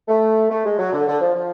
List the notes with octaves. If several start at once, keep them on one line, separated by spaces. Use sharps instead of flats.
A3
A3
G#3
F#3
D3
D3
F3
F3